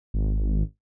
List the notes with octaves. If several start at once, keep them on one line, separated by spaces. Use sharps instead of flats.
G#1